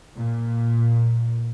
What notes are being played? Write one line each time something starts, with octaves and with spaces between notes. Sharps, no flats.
A#2